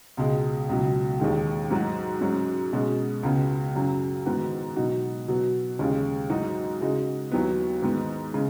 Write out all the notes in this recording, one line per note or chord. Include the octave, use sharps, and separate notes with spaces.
C#2 B2 G#3
C#2 B2 F#3
D#2 D#3 G#3
G#2 F#3 D#4 F#4
G#2 F#3 C#4 F#4
B2 G#3 C#4 F#4
C#2 C#3 B3 F#4
F#2 C#3 F#3
G#2 D#3 B3 F#4
B2 F#3 D#4 F#4
B2 F#3 B3 F#4
D#2 C#3 G#3 C#4
G#2 F#3 D#4 F#4
C#3 G#3 D#4 F#4
D#2 D#3 F#3 B3
G#2 D#3 B3
C#3 G#3